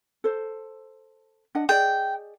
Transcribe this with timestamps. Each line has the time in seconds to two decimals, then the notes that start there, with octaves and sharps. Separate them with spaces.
0.24 A4 C5
1.55 D4 D#5 F#5
1.69 G#4 D5 D#5 G5